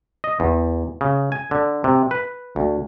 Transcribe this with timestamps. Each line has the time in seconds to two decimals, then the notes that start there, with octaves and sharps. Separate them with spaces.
0.24 D#5
0.40 E2
1.01 C#3
1.32 G#5
1.51 D3
1.84 C3
2.11 B4
2.56 D2